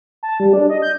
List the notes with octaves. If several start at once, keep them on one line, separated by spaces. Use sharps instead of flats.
A5
G3
D4
D#5
G6